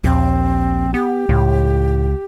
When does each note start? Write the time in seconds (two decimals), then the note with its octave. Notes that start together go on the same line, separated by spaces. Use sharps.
0.04 A#1 D#2 C4
0.94 B3 G4
1.29 C#2 A2